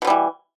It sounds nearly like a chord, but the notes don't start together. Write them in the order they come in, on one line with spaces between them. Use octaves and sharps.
B2 D3 G3 E3